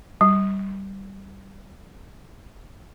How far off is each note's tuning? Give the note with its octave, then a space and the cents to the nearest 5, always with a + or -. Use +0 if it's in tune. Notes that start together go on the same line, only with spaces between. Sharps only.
G3 -10